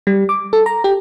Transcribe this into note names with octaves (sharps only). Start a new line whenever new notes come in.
G3
D6
A4
A#5
G4